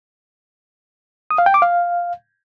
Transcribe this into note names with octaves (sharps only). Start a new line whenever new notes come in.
D#6
F5
G5
D6
F5